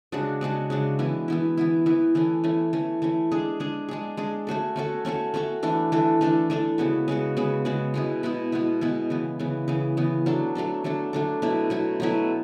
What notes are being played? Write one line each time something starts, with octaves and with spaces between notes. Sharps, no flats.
C#3 G#3 D4 F#4
C#3 G#3 D4 F#4
C#3 G#3 D4 F#4
E3 B3 E4
E3 B3 E4
E3 B3 E4
E3 B3 E4
E3 A3 C#4
E3 A3 C#4
E3 A3 C#4
E3 A3 C#4
G#3 D4 G#4
G#3 D4 G#4
G#3 D4 G#4
G#3 D4 G#4
A3 C#4 F#4 A4
A3 C#4 F#4 A4
A3 C#4 F#4 A4
A3 C#4 F#4 A4
E3 A3 D4 A4
E3 A3 D4 A4
E3 A3 D4 A4
E3 A3 D4 A4
C#3 G#3 B3 F#4
C#3 G#3 B3 F#4
C#3 G#3 B3 F#4
C#3 G#3 B3 F#4
B2 G#3 B3 E4
B2 G#3 B3 E4
B2 G#3 B3 E4
B2 G#3 B3 E4
C#3 E3 B3
C#3 E3 B3
C#3 E3 B3
C#3 E3 B3
F#3 A3 D4 A4
F#3 A3 D4 A4
F#3 A3 D4 A4
F#3 A3 D4 A4
B2 F#3 A3 E4
B2 F#3 A3 E4
B2 F#3 A3 E4